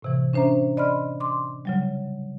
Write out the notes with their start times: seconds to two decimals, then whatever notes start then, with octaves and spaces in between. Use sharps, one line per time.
0.02 A2 C3 E3
0.33 C#4 D4 C5 E5 A#5
0.77 D5 D#5 B5 C6 F6
1.20 C6 D6
1.65 C#3 F#3 G3